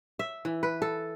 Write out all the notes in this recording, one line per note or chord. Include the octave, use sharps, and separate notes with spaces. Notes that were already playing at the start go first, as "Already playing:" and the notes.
E5
E3
B4
A4